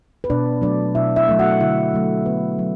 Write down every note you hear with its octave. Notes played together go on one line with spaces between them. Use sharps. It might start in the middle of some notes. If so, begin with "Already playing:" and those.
B4
B2 D4 D5
F#3 A3 D4 D5
B2 E4 E5
E4 E5
F#3 A3
F#4 F#5
D3 E4 E5
F#3 A3
D3 B3 B4
F#3